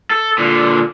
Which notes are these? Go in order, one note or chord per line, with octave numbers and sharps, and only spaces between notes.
A4
A#2 D3